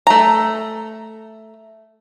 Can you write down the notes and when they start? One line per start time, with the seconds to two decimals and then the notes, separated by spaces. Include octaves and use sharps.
0.07 A3 A#5